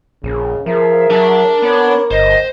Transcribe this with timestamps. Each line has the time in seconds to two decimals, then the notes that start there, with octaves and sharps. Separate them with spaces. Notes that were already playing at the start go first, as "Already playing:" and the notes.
0.24 A#1 C#3
0.66 F3 G#4 A#4 E5
1.10 F#3 D4 A5
1.62 B3 C#5 B5 D6
2.11 G1 C5 D#5